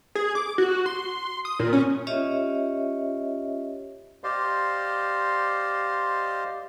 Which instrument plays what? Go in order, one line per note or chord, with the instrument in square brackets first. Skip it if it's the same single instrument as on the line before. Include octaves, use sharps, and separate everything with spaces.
[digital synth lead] G#4
D6
F#4
C6
D#6
A#2
C#4
[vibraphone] C#4 F4 G4 C#5 D#5 E5
[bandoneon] G4 C5 D5 D#5 F5 C6